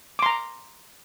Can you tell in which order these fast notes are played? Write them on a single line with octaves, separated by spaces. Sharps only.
D6 C6 A#5